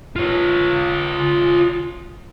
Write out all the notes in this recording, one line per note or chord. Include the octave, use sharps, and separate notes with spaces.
F4 C#5